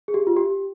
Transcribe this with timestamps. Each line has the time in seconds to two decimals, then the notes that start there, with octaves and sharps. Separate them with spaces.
0.08 G#4
0.14 G4
0.27 F4
0.37 G4